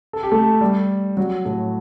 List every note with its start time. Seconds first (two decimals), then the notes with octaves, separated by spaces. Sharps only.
0.13 A4
0.23 G4
0.32 A3 A4
0.61 G3 G4
1.17 F#3 F#4
1.45 A2 A3